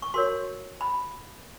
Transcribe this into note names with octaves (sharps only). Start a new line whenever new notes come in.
C#6
F#4 A#4 C#5 C6
B5